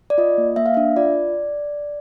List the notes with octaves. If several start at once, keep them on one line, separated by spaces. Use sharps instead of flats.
D5
F4 D#5
A#3
A#3 E5
F5
D4 E5
F4 D5